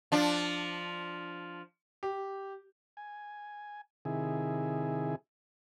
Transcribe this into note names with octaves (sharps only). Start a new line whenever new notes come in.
F3 D4
G4
G#5
C3 D#3 E4 G#4